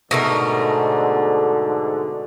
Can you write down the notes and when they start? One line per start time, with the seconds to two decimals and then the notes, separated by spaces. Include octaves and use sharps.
0.11 G#2 B2 D3 A3 A#4